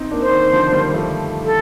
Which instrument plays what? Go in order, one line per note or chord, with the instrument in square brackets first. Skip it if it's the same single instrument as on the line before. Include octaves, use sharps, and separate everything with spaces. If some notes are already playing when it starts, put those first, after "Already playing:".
Already playing: [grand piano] C4 D#4
A#3 D4
[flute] C5
[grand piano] D#3
D3 F3
D#3 G3
F3 A3
[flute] A4